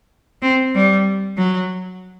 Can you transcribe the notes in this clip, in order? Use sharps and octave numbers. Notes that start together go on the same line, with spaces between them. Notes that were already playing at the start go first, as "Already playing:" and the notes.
C4
G3
F#3